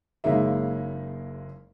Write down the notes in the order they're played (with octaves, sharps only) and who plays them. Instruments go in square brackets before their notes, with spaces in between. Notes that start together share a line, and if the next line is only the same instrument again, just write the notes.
[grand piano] F#1 C#3 G#3 A#3 D#4 E5